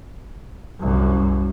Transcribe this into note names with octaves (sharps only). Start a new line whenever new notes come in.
C2 F#2